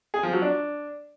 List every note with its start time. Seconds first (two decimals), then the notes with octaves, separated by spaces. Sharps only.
0.14 G#4
0.23 F3
0.33 F#3
0.42 D4